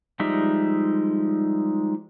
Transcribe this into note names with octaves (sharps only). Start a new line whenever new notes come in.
F3 G3 G#3 D#4 E5